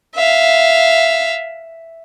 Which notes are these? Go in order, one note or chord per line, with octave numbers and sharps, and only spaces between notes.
E5 F5